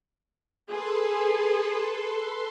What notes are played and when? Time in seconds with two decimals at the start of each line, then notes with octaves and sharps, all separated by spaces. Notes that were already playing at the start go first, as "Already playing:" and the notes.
0.69 G#4 A4 B4 C6